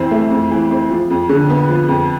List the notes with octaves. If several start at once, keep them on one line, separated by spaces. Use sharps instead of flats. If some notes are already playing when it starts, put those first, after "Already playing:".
Already playing: F2 E3 C4
A3
F2
E3
C4
F3
F2
D3
B3
F3
F2